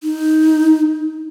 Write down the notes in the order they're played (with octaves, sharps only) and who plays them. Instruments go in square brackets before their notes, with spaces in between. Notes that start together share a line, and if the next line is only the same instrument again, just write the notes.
[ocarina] D#4